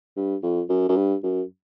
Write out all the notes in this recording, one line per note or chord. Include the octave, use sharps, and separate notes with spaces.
G2
F2
F#2
F#2
G2
F#2